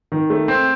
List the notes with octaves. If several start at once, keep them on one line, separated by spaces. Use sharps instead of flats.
D#3
A3
C4